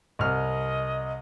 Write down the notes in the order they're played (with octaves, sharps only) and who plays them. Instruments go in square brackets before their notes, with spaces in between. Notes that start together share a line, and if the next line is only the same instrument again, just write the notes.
[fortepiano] C2 F6 [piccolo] D#5